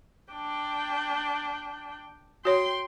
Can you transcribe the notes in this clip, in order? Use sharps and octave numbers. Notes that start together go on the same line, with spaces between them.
D4 G5
F#4 C#5 G5 C6